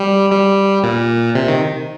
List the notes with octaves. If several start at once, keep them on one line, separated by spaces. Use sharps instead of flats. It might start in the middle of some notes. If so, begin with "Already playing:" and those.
Already playing: G3
G3
A#2
C3
D#3